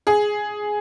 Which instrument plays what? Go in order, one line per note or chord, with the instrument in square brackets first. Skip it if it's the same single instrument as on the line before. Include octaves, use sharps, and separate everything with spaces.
[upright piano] G#4